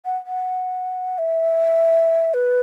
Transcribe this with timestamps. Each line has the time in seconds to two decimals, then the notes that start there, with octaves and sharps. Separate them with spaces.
0.05 F#5
0.26 F#5
1.18 E5
2.34 B4